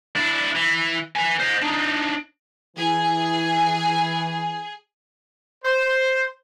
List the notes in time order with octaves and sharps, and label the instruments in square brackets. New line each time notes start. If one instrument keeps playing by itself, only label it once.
[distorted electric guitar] D4 E4
E3
B4 G#5
C5 D#5
D4 D#4
[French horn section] E3 [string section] G#4
[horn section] C5